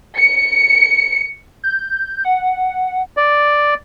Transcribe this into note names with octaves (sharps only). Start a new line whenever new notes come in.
C#7
G6
F#5
D5